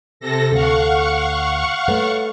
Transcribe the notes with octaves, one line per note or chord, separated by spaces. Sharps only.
C3 A4 A#6
D2 A4 F5 F#5 C#6
A3 B4 C#5